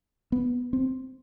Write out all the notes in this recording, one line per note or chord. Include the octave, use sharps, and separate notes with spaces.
B3
C4